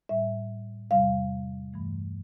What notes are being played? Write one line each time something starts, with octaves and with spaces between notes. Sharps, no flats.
A2 G3 E5
E2 C3 G3 F5
G2 E3 A3